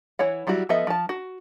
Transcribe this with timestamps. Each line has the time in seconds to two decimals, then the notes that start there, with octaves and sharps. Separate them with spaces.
0.19 E3 E4 C#5 F#5
0.47 F#3 G3 E4 F#4
0.69 F3 B3 A4 D#5 E5
0.87 F3 A5
1.09 F#4